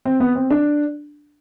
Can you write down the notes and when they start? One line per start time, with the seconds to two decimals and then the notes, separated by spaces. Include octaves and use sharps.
0.05 C4
0.20 B3
0.35 C4
0.50 D4